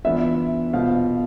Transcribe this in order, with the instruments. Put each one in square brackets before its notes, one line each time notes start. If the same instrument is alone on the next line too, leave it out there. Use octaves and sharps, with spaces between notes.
[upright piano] E3 B3 D4 F4 [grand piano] E5
[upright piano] B2 B3 F4 C5 [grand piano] F5